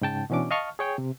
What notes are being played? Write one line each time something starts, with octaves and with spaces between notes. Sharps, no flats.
G#2 C#3 G5 A5
B2 E3 C#4 D4 D6
D#5 F5 A5 C#6 F6
G#4 C#5 G5
C3